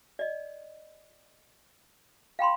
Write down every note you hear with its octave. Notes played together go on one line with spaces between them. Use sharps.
D5 D#5
F5 G5 B5 C6